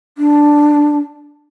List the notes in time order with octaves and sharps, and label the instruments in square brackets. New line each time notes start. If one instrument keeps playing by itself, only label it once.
[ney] D4